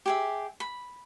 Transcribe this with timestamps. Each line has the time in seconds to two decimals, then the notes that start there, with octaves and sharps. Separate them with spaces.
0.06 G4 G#4 E5
0.60 B5